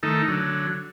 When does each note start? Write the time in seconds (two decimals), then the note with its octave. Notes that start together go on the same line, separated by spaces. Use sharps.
0.03 D#3 A3 D#4 A4
0.28 D3 F#3